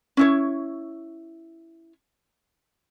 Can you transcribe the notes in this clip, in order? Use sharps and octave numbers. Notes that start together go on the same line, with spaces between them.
C#4 E4 C#5